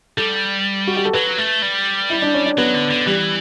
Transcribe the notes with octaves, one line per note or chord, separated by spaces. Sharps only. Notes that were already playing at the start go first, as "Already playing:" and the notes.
G3 A4
F#4
G4
A4
F#3 B4
A3
G3
E4
D4
C#4
D4
F#3 B3
D3
D3
E3 G3